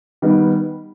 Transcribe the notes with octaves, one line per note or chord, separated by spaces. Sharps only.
D#3 G3 B3